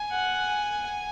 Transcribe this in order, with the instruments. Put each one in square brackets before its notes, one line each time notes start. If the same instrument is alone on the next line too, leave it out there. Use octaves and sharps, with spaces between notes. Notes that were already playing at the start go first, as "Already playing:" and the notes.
Already playing: [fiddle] G#5
[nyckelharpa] F#5